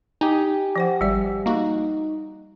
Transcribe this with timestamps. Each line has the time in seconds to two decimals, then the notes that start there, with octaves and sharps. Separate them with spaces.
0.21 D#4 G4 G#5
0.76 F3 C5 F#5
1.01 G#1 G3 D5
1.46 A#3 D#4 F#4